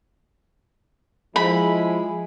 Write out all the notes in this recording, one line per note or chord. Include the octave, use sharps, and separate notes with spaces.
F3 G#3 E4 B5